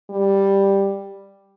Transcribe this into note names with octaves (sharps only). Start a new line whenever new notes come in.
G3